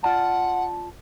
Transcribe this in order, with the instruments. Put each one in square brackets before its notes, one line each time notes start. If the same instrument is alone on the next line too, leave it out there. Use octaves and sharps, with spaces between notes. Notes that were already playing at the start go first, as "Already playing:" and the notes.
[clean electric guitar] F4 D5 A5 [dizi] F#5